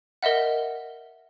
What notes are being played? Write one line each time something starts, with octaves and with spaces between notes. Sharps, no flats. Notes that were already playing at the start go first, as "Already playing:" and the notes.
A#4 D#5 E5 F#5